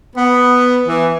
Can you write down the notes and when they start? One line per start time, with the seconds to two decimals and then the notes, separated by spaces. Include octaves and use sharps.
0.16 B3
0.87 E3